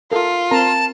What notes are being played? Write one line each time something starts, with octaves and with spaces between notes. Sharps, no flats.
F4 A4 A#4
C4 A#4 A5 A#5